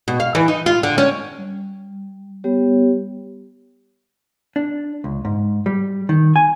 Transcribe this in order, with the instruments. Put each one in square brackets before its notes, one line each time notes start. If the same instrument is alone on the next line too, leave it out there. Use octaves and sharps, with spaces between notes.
[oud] B2
F5
E3
D#4
F4
D3
C#4
[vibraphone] G3
G3 B3 G4 C#5
[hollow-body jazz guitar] D4
C#2
G#2
G3
D#3
G#5